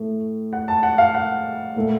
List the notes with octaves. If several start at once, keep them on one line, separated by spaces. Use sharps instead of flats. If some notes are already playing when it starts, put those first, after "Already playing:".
Already playing: A2 A3
F#5
A5
F#5
F5
F#5
A#2 A3